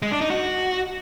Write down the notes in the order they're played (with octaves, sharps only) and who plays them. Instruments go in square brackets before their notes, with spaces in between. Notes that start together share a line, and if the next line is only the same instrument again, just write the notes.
[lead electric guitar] G#3
D4
D#4
F#4